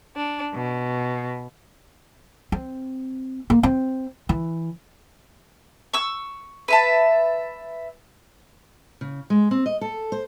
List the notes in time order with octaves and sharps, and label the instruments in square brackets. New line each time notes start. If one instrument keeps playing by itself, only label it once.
[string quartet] D4
B2
[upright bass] C4
A#3
C4
E3
[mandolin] C#6 E6
B4 E5 A5
[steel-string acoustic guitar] C#3
G#3
C4
D#5
A4
C5